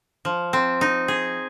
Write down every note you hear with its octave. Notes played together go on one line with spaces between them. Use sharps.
F3
C4
D#4
G#4